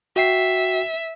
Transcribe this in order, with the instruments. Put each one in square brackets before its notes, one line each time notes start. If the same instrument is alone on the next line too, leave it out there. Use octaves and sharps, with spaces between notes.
[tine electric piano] F#4 G5 C7 [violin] E5